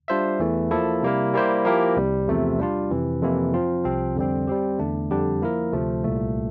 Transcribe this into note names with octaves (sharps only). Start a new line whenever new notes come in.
G3 D4 F4 C5 E5
E2 E3 A3
F3 A#3 E4 A4
C3 G3 A#3 E4 A#4
G3 A#3 E4 G4 C5
F3 A#3 E4 G4 A#4
C2 C3 G3
E2 C3 F3 A3
G3 D4 F4
F2 C3 E3
F2 C3 E3 A#3 E4
F3 C4 F4
C2 C3 F3 C4
F2 D3 G3 C4
G3 C4 G4
E2 D3 A3 D4
F2 D3 G3 D4 G4
F3 A#3 E4 A#4
D2 C3 F3 A3
C2 A#2 A3